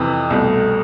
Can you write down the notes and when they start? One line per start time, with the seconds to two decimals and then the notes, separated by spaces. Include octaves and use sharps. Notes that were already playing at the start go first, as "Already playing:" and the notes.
Already playing: F2 C3 E3 B4
0.30 C2 B2 A3